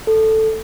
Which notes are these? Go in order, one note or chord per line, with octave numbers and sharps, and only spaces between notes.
A4